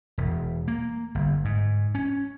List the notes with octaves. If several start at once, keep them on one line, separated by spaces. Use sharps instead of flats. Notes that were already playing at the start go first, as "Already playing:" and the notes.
E1
A#3
G1
G#2
C#4